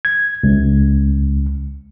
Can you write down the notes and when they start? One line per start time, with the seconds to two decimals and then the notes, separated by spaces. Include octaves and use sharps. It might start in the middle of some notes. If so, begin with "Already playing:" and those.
0.05 G#6
0.44 C#2